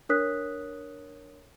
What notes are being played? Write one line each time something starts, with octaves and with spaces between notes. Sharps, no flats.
D4 A#4 C#5 D#6 F#6 B6